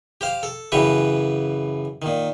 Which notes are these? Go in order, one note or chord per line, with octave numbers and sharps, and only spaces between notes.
G4 C5 F5
A4
F#2 C#3 E3 G4 B4 C#6
A#2 D#3